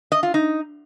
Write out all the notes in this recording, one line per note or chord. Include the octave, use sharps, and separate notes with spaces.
D#5
F4
D#4